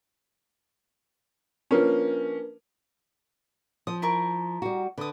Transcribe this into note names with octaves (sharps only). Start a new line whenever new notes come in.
F3 A#3 C#4 D4 A#4 B4
F3 D#6
E4 A#4 C#6
G3 F#4
D3 B4 D#6